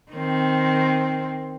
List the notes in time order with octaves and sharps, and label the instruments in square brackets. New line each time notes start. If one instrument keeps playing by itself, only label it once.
[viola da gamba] D#3 C4